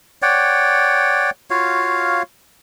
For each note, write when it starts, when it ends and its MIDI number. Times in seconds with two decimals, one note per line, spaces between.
0.22 1.30 73
0.22 1.30 74
0.22 1.30 78
0.22 1.30 79
1.50 2.22 65
1.50 2.22 66
1.50 2.22 73
1.50 2.22 77